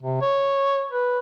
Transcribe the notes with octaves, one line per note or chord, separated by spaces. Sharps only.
C3
C#5
B4